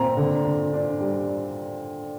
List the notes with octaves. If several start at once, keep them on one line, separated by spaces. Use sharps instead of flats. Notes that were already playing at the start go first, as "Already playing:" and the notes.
Already playing: A#2 C4 A#5
D3
D3
D4
G3